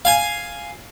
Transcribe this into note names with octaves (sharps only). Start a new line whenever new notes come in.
F5 G#5